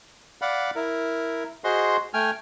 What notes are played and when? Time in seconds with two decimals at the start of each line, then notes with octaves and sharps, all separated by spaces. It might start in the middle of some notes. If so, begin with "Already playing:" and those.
0.42 D5 F5 F#5 B5
0.76 E4 A#4
1.64 F#4 G#4 C5 D#5 C6
2.14 A3 G5 G#5 F6